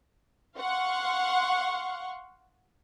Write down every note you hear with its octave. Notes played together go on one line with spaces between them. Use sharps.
F5 F#5 C6 C#6